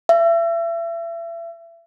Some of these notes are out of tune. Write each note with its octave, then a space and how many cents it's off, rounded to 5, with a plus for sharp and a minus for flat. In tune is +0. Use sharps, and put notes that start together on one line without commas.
E5 +35